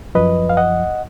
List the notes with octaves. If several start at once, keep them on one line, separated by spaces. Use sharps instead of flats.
F#2 F3 B4 D#5
F5
D#5 F#5